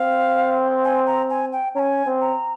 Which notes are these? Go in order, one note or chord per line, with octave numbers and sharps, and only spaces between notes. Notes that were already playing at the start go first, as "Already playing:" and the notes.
Already playing: C4 F5
G#5
A#5
G#5
G5
C#4 G#5 A#5
C4
A#5